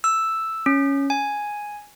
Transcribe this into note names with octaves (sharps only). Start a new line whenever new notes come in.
E6
C#4
G#5